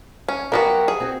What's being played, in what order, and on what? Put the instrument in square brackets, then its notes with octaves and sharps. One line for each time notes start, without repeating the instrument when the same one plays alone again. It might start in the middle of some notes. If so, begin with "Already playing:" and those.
[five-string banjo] C#4
[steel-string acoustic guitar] F#3 G4 A#4 [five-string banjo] A#3 B3 F#4
[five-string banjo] G#4
[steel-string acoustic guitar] C4 F#4